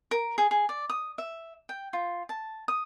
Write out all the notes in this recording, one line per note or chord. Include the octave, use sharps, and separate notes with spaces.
A#4
G#4
G#4
D5
D#6
E5
G5
F4
A5
D#6